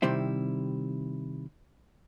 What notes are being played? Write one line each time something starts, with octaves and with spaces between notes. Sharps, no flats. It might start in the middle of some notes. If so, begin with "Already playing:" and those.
C3 D#3 G3 C4 E4